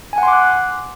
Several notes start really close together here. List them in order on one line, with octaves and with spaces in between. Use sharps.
G#5 F#5 C6 D6 F#6